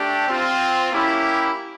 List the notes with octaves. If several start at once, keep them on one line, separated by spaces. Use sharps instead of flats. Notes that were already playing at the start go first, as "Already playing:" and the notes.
Already playing: A3 D4 G4
C4 F4
A#3 C#4 E4 G4